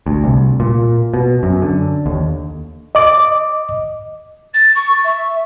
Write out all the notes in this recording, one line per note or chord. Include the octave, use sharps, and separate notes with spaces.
D2
C2
A#2
B2
F#2
D3
D#2
D#5 D6
A6
C#6
E5